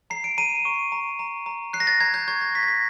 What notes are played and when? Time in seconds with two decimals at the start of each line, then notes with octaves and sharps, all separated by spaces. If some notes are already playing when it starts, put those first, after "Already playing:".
0.10 A#5 C7
0.24 D7
0.38 A#5 D#7
0.65 C#6
0.92 A#5
1.19 A#5
1.46 A#5
1.73 F#6 C7
1.80 A#6
1.87 A6
2.00 A#5 G#6
2.14 G6
2.28 C#6 G#6
2.41 A#6
2.55 C#6 B6
2.63 A#6
2.68 B6